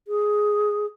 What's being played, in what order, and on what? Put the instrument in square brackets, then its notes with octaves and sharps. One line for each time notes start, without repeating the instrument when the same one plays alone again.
[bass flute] G#4